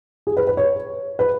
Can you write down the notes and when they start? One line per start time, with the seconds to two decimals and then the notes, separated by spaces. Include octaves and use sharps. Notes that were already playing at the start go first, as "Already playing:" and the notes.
0.27 G#4
0.37 B4
0.47 B4
0.57 C#5
1.19 B4